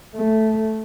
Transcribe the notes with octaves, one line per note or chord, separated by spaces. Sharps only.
A3